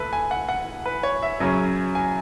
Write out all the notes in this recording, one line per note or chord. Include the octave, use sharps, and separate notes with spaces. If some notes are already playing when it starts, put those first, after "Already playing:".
Already playing: D2 A4 B4
G#5
F#5
F#5
B4
C#5
E5
F#2 C#3 F#3 C#4
G#5